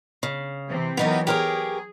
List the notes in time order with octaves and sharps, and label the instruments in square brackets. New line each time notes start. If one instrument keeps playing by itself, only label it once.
[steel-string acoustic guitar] C#3
[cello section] C3 E3 C4
[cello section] E3 F#3 A#4 [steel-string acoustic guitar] B3 D#4 G4
[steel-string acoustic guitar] G4 A#4 C#5 [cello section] G#4